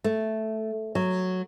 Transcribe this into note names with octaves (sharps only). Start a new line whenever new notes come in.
A3
F#3